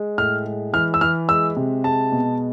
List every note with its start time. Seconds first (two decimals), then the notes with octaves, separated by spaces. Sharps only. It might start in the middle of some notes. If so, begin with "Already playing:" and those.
Already playing: G#3
0.18 A2 F6
0.46 G#3
0.73 E3 F6
0.94 E6
1.01 E3 F6
1.29 G#3 E6
1.57 C3
1.84 G#3 A5
2.12 B2